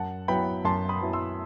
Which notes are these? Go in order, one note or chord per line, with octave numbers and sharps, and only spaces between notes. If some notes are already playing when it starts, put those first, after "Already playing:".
Already playing: F#2 F#5 A5
F#3 B3 E4 G5 B5
F#2 A5 C6
B5 D#6
F#3 B3 E4
C6 E6